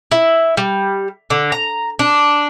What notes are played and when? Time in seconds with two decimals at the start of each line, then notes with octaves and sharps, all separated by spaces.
0.11 E4
0.57 G3
1.30 D3
1.52 A#5
1.99 D4